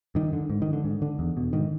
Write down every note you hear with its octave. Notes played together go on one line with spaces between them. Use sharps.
G2 D#3
D3
G#2
D#3
D3
G#2
D3
E2
B2
G#2 D#3